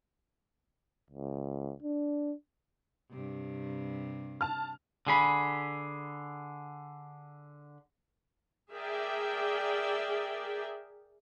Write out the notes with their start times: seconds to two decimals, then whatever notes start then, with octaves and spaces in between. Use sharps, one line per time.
1.11 C#2
1.83 D4
3.10 G2 C3
4.41 A5 F6
5.07 D3 G#4 B5
8.73 G#4 A#4 D5 E5 G5